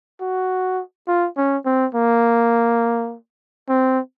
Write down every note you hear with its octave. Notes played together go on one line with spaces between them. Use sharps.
F#4
F4
C#4
C4
A#3
C4